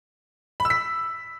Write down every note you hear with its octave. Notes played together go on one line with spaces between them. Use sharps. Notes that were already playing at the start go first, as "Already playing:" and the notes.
B5
E6
B6